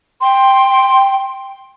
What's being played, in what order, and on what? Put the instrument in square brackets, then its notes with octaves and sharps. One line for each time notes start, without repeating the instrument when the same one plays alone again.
[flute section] G5 C6